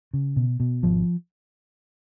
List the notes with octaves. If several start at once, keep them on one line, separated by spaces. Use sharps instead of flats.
C#3
B2
B2
G#1 F3